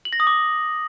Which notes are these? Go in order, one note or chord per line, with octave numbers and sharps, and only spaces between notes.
F#7
A#6
D#6
D6